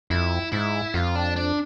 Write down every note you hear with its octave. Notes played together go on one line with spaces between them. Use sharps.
F2 E4
G#2 E4
F2 F4
D4
D4